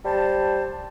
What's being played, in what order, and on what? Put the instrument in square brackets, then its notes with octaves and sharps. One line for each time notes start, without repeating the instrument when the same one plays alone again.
[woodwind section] G3 C5 A5